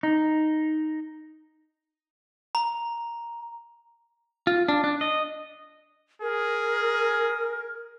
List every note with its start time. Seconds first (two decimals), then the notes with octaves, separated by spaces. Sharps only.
0.03 D#4
2.55 A#5
4.47 F4
4.68 D4
4.84 D4
5.01 D#5
6.22 G#4 A#4